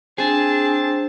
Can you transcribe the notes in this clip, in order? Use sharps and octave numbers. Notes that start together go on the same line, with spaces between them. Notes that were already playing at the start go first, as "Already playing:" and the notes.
C4 D4 G#4 A5